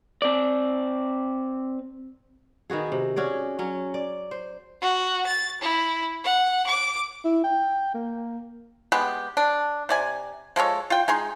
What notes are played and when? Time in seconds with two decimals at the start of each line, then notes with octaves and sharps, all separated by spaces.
0.22 C4 D5
2.70 D#3 B3 F#4 G#4
2.92 C3
3.16 C#4 F#4 G#4 D5
3.59 F#3 C#4
3.94 D5
4.31 C5
4.81 F#4
5.26 A6
5.61 E4
6.24 F#5
6.67 D6
7.24 E4
7.44 G5
7.94 A#3
8.92 G#3 B3 G4
9.37 D4
9.89 C3 D5 G#5
10.56 F3 G#3 A4 C#5
10.90 F4 G5
11.08 G#3 D#4 G#4 C6